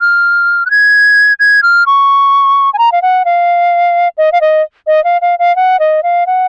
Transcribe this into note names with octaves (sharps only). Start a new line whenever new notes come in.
F6
F#6
G#6
G#6
F6
C#6
G#5
A#5
F5
F#5
F5
D#5
F5
D#5
D#5
F5
F5
F5
F#5
D#5
F5
F#5